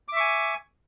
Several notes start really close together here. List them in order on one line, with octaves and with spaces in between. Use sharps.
D6 E5 C#6 G#5